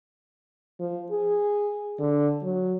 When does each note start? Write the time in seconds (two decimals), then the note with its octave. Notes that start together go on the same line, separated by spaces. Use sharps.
0.80 F3
1.11 G#4
1.99 D3
2.43 F#3